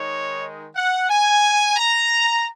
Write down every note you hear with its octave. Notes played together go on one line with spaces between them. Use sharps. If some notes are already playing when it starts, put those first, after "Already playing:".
Already playing: D#3 G#3 D#4 C#5
F#5
G#5
A#5